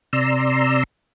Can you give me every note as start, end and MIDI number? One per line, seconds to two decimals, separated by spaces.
0.13 0.83 48
0.13 0.83 74
0.13 0.83 82
0.13 0.83 84
0.13 0.83 88